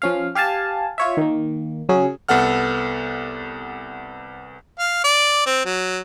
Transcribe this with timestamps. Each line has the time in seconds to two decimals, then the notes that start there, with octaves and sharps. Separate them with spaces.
0.02 F3 C#4 F5
0.35 G4 F5 G#5 A5
0.98 F4 C#5 E5
1.17 D#3 A#3
1.89 C#3 F#3 C#4 G#4
2.29 C2 B3 A4 F#5 F6
4.79 F5
5.04 D5
5.46 C4
5.65 F#3